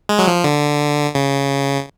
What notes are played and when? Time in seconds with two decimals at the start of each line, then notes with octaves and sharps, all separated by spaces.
0.09 G#3
0.19 F#3
0.27 F3
0.44 D3
1.15 C#3